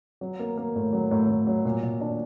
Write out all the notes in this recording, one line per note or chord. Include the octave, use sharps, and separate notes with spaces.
F#3
A#3
A#3
A2
F#3
A2
A2
F#3
A#2
A#2
D4